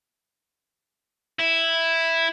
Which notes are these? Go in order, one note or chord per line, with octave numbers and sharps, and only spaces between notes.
E4